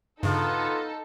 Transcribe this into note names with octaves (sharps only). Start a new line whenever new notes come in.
G2 C#3 B3 D#4 F4 A4